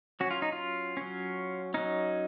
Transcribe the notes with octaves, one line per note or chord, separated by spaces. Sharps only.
F#3 C#4 F#4
F4
D#4
F4
F#3 C#4
F#3 C#4 D#4